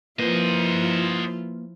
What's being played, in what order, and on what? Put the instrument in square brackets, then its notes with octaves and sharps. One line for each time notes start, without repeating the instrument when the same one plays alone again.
[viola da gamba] F3 E4 F4 [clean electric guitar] A#3 B4 [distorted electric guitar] C5 D#5